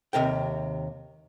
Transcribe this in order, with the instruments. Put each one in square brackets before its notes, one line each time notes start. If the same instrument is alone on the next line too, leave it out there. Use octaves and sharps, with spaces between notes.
[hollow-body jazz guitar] D#2 C3 A#4 G5